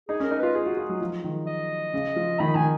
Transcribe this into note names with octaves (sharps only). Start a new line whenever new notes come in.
D#4 G#4
C#4
A#4
D#4
F4 B4
G#4
F#4
F4
F#3
F3
D#3
D#5
C#3
F3
D#3 B5
D#3 G#5